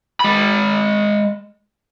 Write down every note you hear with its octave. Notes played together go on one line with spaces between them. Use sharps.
G#3 B5